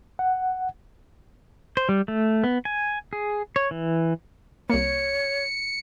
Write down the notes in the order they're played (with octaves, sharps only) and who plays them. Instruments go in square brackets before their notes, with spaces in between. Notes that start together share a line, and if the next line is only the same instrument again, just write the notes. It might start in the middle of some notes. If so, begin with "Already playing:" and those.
[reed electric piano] F#5
[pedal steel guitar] C5
G3
A3
B3
G#5
G#4
C#5
E3
[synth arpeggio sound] C2 A#3 [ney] C#5 [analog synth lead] C#7